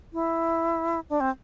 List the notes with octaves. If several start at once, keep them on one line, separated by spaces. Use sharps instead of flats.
E4
D4
C4